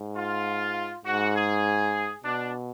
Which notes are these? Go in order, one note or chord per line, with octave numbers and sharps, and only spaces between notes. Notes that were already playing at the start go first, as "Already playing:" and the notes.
Already playing: G#2
F4
G#2 F#4
G#4
B2 D4